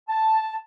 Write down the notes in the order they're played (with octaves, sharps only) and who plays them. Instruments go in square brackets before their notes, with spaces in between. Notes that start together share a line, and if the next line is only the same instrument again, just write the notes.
[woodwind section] A5